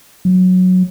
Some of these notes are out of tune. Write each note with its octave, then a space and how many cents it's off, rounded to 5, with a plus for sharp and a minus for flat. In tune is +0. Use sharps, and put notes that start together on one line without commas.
F#3 -10